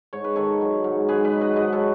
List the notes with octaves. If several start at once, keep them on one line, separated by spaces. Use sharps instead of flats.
G#2 C#5
B4
D#3 A4 C#5
F#3
G#2
G#2 G#4 B4
B4 D#5
F#3
B4 D#5
G#2 B4 D#5
A4 C#5